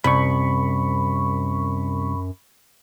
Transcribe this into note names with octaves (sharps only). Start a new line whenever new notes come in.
C2 F#2 B5 C#6